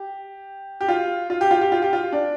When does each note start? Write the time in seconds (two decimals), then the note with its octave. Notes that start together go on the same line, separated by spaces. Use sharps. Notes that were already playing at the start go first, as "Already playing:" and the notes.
Already playing: G4
0.81 G4
0.88 F4
1.30 F4
1.41 G4
1.51 F4
1.61 G4
1.72 F4
1.82 G4
1.93 F4
2.13 D4